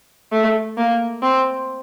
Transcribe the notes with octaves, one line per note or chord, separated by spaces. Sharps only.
A3
A#3
C4